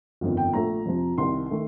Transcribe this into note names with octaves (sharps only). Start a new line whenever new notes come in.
G1 F2 D#3
G5
A#1 A#2 A3 A#5
F2 C3 F3
C2 C3 D#3 C6
D#3 A3